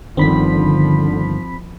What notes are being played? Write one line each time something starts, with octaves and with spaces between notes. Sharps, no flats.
G1 D3 D#3 F3 C4 B5 B6